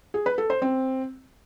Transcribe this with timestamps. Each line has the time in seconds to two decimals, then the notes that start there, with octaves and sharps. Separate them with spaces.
0.14 G#4
0.26 B4
0.38 A4
0.50 C5
0.62 C4